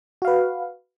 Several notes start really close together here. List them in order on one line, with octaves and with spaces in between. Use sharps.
F#4 F5 B4